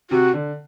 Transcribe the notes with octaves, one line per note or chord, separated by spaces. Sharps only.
C3 F#4
D3